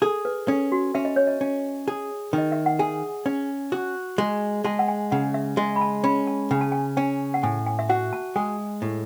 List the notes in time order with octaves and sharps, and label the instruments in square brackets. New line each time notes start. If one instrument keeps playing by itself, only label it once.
[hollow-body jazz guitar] G#4 [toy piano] A4
[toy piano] B4
[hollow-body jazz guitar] C#4 [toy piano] A4
[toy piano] F#4
[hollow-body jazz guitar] C#4 [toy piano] E5
[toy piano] D#5
C#5
D#5
[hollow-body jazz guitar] C#4
G#4
D#3
[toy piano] D#5
E5
F#5
[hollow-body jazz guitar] G#4 [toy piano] G#5
[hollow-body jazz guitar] C#4
F#4
G#3
[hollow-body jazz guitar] G#3 [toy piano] A5
[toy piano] F#5
G#5
[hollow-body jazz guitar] C#3 [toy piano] F#5
[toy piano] E5
[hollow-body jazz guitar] G#3 [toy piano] D#5
[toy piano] B5
A5
[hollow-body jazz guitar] C#4 [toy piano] B5
[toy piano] A5
[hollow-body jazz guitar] C#3 [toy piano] G#5
[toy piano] A5
G#5
[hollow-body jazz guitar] C#4 [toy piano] G#5
[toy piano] F#5
[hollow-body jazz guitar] A2 [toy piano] G#5
[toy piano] G#5
E5
[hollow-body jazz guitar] F#4 [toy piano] F#5
[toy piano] A5
[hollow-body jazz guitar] G#3 [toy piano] G#5
[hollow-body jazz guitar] A2